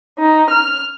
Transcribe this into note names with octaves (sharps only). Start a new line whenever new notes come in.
D#4
F6